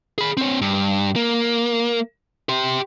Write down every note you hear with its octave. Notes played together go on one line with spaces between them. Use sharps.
G#4 B5
C4 C#5
G2
A#3
G4 C6